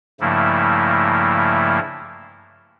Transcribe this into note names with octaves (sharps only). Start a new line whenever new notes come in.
G2 C#3 F3 A3 A#3 E4